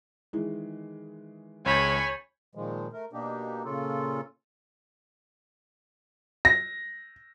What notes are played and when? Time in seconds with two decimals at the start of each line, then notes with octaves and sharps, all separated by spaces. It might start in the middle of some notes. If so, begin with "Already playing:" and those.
0.33 D#3 E3 G#3
1.66 C#2 C#5 G#5 B5 G6 A6
2.55 A#2 D#3 F3 G#3
2.93 A3 A#4
3.13 B2 A#3 D4 D#4 G4
3.65 A#2 C#3 C#4 F4 A4
6.45 A#6